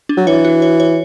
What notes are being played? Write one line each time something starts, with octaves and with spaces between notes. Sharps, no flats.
D4
F#3
E3 C#5
F#4
C#5
C#5